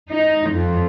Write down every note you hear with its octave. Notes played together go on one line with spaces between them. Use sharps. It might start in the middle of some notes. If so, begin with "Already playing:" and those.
D#4
F2